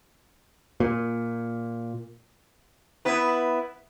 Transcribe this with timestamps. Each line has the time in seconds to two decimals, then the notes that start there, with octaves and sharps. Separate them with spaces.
0.80 A#2
3.05 B3 E4 B4